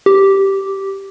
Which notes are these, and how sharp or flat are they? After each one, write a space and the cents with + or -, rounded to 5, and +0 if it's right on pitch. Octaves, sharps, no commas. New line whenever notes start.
G4 -10